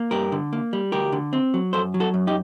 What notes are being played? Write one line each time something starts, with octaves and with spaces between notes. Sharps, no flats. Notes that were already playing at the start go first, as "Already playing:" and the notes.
Already playing: A#3
G2 G4 A#4
D3
A#3
G3
D2 G4 A#4
D3
C4
F#3
F#2 A4 C5
F#3
F#4 A4
F#2
D#4 G4